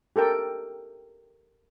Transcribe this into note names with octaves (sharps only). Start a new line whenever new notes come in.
G4 A4 A#4 G5